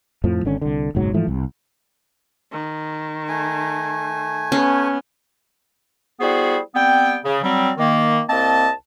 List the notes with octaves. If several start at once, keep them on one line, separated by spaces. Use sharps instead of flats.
F2 A2 F3
G#1 D3 C#4
C2 D3
F#1 B1 G#2 F#3
G#2 E3 F3 A3
C2
D#3
A3 G#5
B3 C#4
G3 B3 E4 F#4 G#4 C5
G3 B3 C4 G5
C#3
F#3 G3 C4
D#3 A#3
C2 A#3 C4 D#5 A5